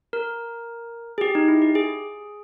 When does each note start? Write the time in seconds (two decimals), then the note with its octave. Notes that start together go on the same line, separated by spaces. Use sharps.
0.13 A#4
1.18 G#4
1.21 G4
1.35 D#4
1.48 E4
1.62 G4
1.75 G#4